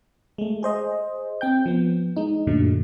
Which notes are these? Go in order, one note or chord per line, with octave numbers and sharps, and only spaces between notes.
G#3 A3
G#4 C5 D#5
C4 G5 G6
F3 B3
G#3 D#4
F#2 A#2 D3 F#3 A3